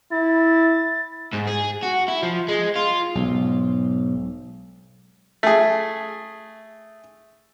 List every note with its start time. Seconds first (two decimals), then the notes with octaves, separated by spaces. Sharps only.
0.12 E4 A6
1.33 G#2
1.47 G#4
1.83 F#4
2.08 E4
2.23 F3
2.48 G#3
2.75 F4
3.15 B1 G#2
5.43 A3 G#4